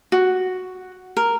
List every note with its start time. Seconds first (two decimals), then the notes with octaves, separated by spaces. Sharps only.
0.12 F#4
1.17 A#4